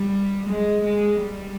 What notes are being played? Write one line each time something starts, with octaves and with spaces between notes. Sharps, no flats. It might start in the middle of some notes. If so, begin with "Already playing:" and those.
Already playing: G3
G#3
G#3
G3